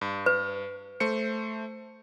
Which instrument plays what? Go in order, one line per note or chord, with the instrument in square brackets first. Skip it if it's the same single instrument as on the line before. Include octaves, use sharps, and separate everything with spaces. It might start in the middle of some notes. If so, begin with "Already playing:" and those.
[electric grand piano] G2
[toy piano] B4
[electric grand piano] A3 C5 C#7